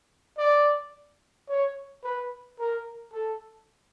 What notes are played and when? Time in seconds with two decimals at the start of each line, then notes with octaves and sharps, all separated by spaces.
0.38 D5
1.48 C#5
2.04 B4
2.59 A#4
3.13 A4